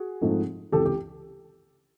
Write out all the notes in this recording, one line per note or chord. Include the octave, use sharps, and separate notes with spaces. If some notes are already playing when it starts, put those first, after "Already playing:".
Already playing: F#4 G#4
G#2 F3 A3 C4 D#4
C#2 C3 E3 G4 A4
G4